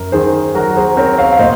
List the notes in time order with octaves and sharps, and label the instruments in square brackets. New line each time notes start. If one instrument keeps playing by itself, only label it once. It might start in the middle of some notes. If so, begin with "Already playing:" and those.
Already playing: [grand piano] F#2 A#4
D#3 G#4 C5
F#3 F#4 A#4
G#4 C5
C4 A#4 C#5
C#5 F5
F5
A#2 C5 D#5